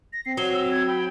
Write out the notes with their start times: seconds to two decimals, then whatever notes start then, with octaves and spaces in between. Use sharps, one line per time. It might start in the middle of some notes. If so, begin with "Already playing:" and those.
0.13 A#6
0.26 C4 C7
0.37 F#3 G7
0.53 E6
0.71 G#6
0.87 G5 B5